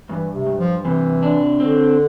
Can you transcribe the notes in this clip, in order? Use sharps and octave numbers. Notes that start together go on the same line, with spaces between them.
G2 E3
C3
G2
F3
C3 E3
D4
D3 C4